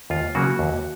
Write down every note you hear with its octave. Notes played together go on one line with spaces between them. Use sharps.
D#2 F4
C#3 F#3 A#3 F#4
D#2